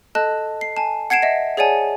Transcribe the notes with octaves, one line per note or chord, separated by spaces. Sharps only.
A4 D#5 A5 F#6
C7
G#5 A5
F#5 G#6 C7 D7 E7
D#5 E5
G#4 C#5 D5 F#5 G#5 A5